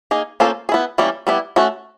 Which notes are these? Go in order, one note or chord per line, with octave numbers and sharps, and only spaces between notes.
A#3 D#4 G#4
A#3 C#4 F4 A4 C5
G#4
B3 E4
E3 G3 A#3 C#4
G3 B3 E4
A3 C#4 F#4